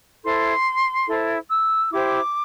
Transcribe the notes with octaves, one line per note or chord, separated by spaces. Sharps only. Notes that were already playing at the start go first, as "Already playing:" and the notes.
E4 A4 C5 C6
E4 A4 C5
E6
E4 G4 C5 D6